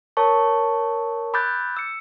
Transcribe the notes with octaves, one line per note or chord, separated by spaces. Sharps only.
A#4 C#5 A5 C#6
B5 D6 E6 F#6 G6 A6
E6 C#7